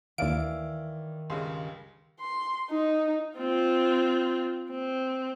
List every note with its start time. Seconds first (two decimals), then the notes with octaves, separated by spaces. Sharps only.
0.18 D#2 D#3 E3 D5 E5 F5 D7
1.30 C#2 G2 C#3 C6
2.20 C6
2.70 D#4
3.38 C4 F4
4.70 C4